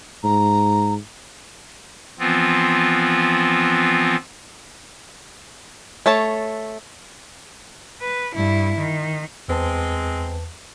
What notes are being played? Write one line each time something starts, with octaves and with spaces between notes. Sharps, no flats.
G#2 A#5
E3 F3 B3 C4 F4
A3 C#5 A5
B4
G2 E4
D#3
E2 G#3 C4 B4 A5